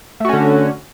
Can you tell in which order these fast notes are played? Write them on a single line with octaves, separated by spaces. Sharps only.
A3 F#4 C#4 D3